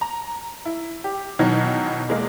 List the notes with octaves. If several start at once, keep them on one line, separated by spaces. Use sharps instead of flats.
A#5
E4
G4
B2 D#3 E3 F#3
E2 G#3 A#3